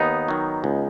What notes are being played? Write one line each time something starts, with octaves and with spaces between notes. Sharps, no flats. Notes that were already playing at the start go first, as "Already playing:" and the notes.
Already playing: D#2 B3 D#4
D#3 F#3
C#2